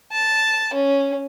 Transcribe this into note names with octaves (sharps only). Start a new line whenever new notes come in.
A5
C#4